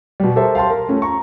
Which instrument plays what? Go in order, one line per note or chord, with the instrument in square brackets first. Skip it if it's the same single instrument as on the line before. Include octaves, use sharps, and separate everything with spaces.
[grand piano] B2 G3
G4 A4 A#4 C5 E5 A5
F5 G5 A5 C6
A#4
A3 C#4 F4
A#5 C#6